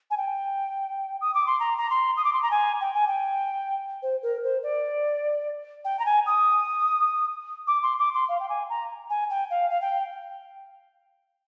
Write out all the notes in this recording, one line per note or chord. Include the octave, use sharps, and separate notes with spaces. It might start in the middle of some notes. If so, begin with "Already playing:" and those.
G#5
G5
D#6
D6
C6
A#5
A#5
C6
D#6
D6
C6
A#5
G#5
G5
G#5
G5
C5
A#4
C5
D5
G5
A#5
G#5
D#6
D6
C6
D6
C6
F5
G5
G#5
A#5
G#5
G5
F5
F5
G5